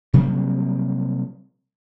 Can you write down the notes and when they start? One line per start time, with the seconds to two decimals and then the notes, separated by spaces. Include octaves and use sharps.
0.14 C3 F#3 G3 A#3